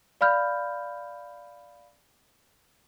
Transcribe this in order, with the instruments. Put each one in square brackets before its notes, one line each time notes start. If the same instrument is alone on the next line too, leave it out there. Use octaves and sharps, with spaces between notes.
[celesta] D5 F5 B5 F6 G6